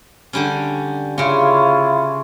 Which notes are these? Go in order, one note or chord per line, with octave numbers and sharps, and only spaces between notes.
D3 G3 C#4
C#3 C#4 E4 F4 C#5